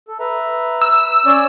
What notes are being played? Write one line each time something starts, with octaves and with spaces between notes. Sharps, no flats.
A4
B4 E5 A#5
E6
C#4 C#5 D5